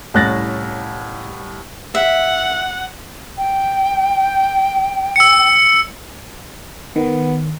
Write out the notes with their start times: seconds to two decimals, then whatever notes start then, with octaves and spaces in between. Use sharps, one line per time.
0.14 C2 A2 C#4 F#6 A6 A#6
1.95 E5 F#5
3.38 G5
5.16 E6 C#7
6.96 D#3 B3